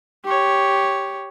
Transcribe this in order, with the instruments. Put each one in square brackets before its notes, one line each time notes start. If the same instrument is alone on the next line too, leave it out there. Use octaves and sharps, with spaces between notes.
[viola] G4 C#5